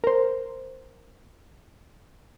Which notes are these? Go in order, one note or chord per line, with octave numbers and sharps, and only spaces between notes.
A#4 C5